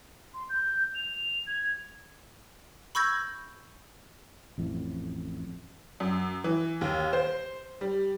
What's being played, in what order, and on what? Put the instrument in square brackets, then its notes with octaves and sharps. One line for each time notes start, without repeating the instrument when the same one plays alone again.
[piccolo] C6
G6
F7
G#6
[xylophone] B5 C#6 E6 G6 G#6 A#6
[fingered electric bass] A1 F2 A2
[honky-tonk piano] F#2
E3
D#2
C5
G3